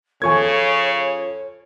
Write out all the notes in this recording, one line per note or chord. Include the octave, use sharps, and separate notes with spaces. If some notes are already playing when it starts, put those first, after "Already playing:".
C#3 F3 F4 A4 C#5 G#5 C#6 G#6